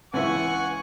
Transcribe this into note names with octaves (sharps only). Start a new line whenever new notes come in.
C#2 E3 E5 F#5 G#5 C#6